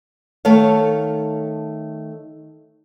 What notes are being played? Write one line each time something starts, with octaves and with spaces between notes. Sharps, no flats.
D#3 A3 A4 C#5 F5